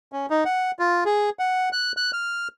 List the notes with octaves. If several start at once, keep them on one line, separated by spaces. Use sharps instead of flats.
C#4
D#4
F#5
F4
G#4
F#5
F#6
F#6
F6